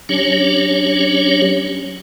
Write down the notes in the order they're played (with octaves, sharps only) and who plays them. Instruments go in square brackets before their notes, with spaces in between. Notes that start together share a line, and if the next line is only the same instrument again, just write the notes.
[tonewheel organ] F#3 C#4 D4 G4 C#5